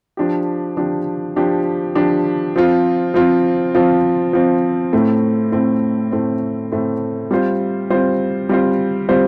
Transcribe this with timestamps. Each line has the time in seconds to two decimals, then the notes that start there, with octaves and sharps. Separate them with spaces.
0.17 F3 D4 G4
0.77 F3 D4 G4
1.36 F3 D4 G4
1.95 F3 D4 G4
2.56 F3 C4 F4
3.14 F3 C4 F4
3.75 F3 C4 F4
4.33 F3 C4 F4
4.93 A2 A3 C4
5.52 A2 A3 C4
6.12 A2 A3 C4
6.72 A2 A3 C4
7.31 G3 C4 F4 C5
7.90 G3 C4 F4 C5
8.49 G3 C4 F4 C5
9.09 G3 C4 F4 C5